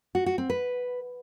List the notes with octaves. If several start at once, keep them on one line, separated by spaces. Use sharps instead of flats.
F#4
F#4
C4
B4